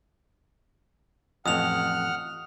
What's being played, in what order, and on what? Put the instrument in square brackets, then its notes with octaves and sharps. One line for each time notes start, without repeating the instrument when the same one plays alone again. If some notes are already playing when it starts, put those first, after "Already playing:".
[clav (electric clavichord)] A1 F2 [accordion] F#5 F6 [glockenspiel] D#6 F7